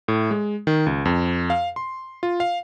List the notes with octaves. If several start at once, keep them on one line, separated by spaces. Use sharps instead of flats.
A2
G#3
D#3
C#2
F2
F5
C6
F4
F5